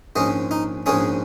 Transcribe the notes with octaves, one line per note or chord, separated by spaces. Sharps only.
A#1 G#2 G#3 C#4 D#5
D#4
A#1 G#2 G#3 C#4 G#4